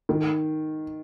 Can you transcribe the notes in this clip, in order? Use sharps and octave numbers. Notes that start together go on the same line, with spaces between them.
D#3